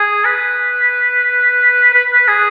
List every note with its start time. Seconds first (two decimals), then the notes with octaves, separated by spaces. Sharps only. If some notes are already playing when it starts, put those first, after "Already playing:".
Already playing: G#4
0.25 B4
1.94 B4
2.13 B4
2.28 G#4